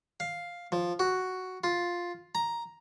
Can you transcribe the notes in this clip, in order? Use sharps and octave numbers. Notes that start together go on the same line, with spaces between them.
F5
F3
F#4
F4
A#5